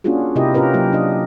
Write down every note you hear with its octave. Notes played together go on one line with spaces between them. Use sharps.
A#3 C#4 D4 F4 F#4 G#4
C3 E4 G4 A#4 D#5
C#4 F4 G4 A#4 B4
F#3 A#3 G4
D4 D#5